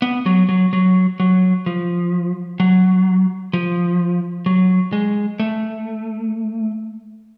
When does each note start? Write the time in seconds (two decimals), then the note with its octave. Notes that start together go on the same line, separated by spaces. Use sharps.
0.02 B3
0.26 F#3
0.49 F#3
0.73 F#3
1.20 F#3
1.66 F3
2.60 F#3
3.53 F3
4.46 F#3
4.93 G#3
5.40 A3